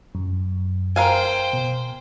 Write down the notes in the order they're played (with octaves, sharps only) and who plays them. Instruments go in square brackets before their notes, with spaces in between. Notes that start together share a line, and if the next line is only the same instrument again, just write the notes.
[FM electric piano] F#2
[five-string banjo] A#4 F5 G#5 [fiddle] C5 G5
[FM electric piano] B2